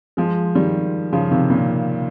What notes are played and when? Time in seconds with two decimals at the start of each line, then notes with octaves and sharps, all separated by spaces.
0.17 F3 G#3
0.55 D#3 G3
1.13 C#3 F3
1.31 C3 D#3
1.50 A#2 C#3